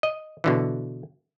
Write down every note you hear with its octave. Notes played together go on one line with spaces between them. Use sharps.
D#5
B2 D3 E3